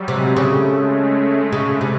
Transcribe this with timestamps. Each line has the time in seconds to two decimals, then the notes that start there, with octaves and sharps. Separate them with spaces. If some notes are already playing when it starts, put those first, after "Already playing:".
Already playing: F#3 G3
0.08 C3 G#3
0.36 C#3 A3
0.65 G#3
0.95 A3
1.52 C#3
1.81 C3